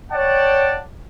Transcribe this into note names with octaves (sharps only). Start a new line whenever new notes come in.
C#5 D5 F#5 G5 A5